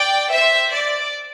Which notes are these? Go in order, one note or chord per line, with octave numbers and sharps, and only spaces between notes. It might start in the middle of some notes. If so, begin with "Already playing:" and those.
Already playing: D5 G5
C5 E5
D5